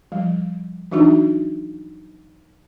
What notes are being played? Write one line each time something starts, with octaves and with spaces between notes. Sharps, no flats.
F3 G3
E3 F#3 D4 D#4 F#4